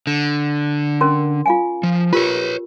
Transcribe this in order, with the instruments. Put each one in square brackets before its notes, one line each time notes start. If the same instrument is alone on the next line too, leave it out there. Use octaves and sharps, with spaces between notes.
[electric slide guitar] D3
[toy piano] C#4 A#4 C6
F4 F5 G#5
[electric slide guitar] F3
[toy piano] F4 G4 A#4 [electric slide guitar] B4 C#5